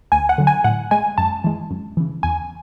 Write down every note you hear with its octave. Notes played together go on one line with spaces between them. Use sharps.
D2 G#5
F#5
D3 F#3
G#5
A2 F#5
G#3 G#5
F#2 A5
E3 G#3
F#2
C#3 E3
E2 G#5